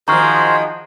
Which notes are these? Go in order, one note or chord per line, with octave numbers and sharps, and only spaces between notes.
D#3 F3 F#4 G#4 C5 A#5 C#6 F6